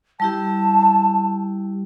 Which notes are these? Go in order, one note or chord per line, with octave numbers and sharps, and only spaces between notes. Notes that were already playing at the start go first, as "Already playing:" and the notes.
G3 E4 G4 A5